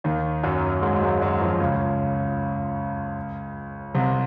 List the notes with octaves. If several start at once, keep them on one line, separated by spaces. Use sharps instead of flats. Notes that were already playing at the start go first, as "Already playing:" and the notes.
D#2 D#3
F#2 F#3
G#2 G#3
F#3
G#2 G#3
F#2 F#3
F2 F3
C#2 C#3
C2 C3